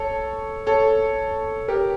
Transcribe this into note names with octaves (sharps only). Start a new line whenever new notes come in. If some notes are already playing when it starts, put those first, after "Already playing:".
Already playing: A4 C#5
A4 C#5
G4 A#4